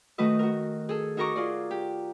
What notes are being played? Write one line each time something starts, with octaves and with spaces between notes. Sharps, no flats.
D#3 A3 F#4 B4 D#5
F#4 A#4
G#4 A4
D#4 F#4 A#4 A#5 C#6 D6
F4 G#4 D5
G4